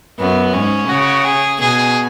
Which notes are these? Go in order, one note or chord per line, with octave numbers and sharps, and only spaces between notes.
F#2 B3
G#2 C#4
C#3 F#4
G#4
B2 G#4